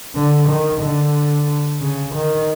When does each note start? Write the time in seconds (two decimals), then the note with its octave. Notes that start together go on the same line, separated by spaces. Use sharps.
0.15 D3
0.49 D#3
0.82 D3
1.81 C#3
2.15 D#3